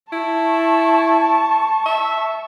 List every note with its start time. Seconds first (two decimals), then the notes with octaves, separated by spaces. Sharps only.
0.12 E4 A5 C#6
1.86 E5